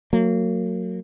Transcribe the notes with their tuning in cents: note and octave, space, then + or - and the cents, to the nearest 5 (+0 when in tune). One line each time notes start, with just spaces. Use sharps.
F#3 -10 A#3 -30